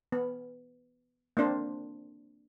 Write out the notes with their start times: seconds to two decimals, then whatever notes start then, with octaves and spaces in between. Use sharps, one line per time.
0.12 B3
1.37 A#3 C4 D4 C5